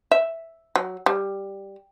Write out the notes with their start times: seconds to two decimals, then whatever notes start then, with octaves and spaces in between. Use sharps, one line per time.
0.11 E5
0.76 F#3
1.06 G3